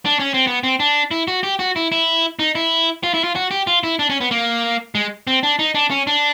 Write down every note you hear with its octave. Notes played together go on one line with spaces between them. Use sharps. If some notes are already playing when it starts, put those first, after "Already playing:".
D4
C#4
C4
B3
C4
D4
E4
F#4
G4
F#4
E4
E4
D#4
E4
F4
E4
F4
F#4
G4
F4
E4
D4
C#4
B3
A#3
G#3
C4
D4
D#4
D4
C#4
D4